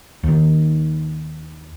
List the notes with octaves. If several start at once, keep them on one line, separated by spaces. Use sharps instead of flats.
D#2 D#3